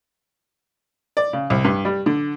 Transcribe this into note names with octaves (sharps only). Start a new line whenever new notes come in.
D5
C#3
C2
G2
G3
D3